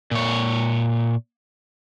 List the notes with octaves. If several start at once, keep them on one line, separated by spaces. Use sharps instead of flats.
A#2 C#5